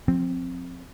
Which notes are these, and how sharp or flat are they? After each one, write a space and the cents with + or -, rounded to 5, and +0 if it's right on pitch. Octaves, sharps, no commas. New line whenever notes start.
F3 +20 C4 +5